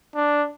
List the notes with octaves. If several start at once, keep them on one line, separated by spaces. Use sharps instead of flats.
D4